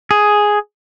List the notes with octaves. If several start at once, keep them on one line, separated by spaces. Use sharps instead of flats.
G#4